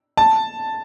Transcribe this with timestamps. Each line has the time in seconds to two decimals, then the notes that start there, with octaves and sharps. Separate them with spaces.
0.17 A5